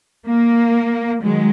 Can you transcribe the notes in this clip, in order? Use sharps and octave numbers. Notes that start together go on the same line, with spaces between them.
A#3
D#3 F#3 G#3